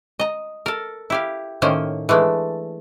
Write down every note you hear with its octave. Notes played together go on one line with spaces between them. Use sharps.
D#5 A#5
A4 A#4
E4 G4 F5
A2 D#3 A#3 C#4 C5
E3 G#3 A3 D4